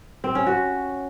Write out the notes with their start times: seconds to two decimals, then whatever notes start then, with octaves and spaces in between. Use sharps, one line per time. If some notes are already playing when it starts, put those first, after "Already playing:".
0.24 C4
0.35 C#4
0.47 F#4